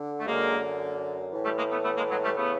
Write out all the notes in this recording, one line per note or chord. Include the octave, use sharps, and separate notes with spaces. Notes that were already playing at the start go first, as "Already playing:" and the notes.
Already playing: D3
A3
F#2 D3 G#3 A#3
A2 E3
G3 A3
G#3 A#3
A3 B3
A3 B3
G#3 A#3
F#3 G#3
G3 A3
C#3 E3 A3 B3